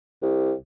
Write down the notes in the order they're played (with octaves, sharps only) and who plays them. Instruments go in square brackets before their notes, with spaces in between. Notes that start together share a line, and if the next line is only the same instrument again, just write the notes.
[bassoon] C2